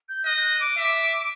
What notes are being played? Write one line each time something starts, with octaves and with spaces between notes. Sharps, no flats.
G6
D#5 F#6
G6
F#6
D6
E5